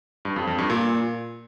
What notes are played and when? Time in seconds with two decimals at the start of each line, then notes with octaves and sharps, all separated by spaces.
0.25 G2
0.36 F2
0.47 F2
0.58 G2
0.70 A#2